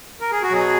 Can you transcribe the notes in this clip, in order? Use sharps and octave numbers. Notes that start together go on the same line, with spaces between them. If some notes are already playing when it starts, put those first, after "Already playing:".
A#4
G#4
F#4
B2 F#3 G#4